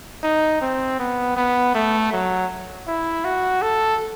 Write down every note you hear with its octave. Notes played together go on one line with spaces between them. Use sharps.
D#4
C4
B3
B3
A3
F#3
E4
F#4
A4